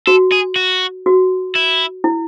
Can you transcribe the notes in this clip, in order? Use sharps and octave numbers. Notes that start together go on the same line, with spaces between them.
F#4 A4
G#4
F#4
F#4
E4
E4